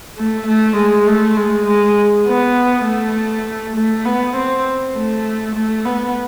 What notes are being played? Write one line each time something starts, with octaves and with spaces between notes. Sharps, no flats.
A3
A3
G#3
A3
G#3
G#3
B3
A3
A3
B3
C4
A3
A3
B3